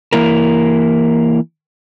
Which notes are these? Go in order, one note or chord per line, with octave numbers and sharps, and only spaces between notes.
E3 A#3 E4 A#4